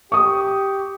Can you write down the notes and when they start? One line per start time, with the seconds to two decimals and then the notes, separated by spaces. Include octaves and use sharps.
0.12 G4 C#6 D#6